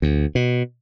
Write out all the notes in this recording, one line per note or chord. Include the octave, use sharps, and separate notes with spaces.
D2
B2